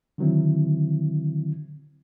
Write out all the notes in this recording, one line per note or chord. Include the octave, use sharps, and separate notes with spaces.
D3 D#3 F#3 C4 E4